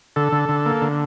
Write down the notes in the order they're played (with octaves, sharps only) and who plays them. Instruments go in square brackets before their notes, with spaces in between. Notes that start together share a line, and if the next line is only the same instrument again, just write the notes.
[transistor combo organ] D3 A4
D3
D3
A#3
D3